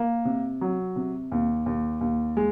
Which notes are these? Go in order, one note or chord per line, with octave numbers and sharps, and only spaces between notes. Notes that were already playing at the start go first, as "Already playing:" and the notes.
Already playing: A#3
C3
F#3
C3
D#2
D#2
D#2
G#3